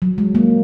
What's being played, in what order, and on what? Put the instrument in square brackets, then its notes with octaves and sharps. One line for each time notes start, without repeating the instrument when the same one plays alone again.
[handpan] F#3
G#3
A#3